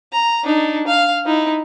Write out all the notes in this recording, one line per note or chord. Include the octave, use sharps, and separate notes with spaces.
A#5
D4 D#4
F5
D#4 E4